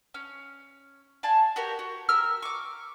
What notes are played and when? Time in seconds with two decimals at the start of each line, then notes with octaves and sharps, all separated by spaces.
0.14 C#4
1.23 D5 F5 G#5 A5
1.56 F#4 G4 A#4
1.79 F#4
2.09 G4 A#4 E6 F6
2.42 C#6 D6